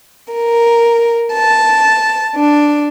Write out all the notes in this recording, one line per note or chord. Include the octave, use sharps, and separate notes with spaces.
A#4
A5
D4